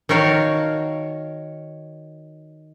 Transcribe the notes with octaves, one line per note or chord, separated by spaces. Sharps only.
D#3 F#4 A#4 C#5 F5 A5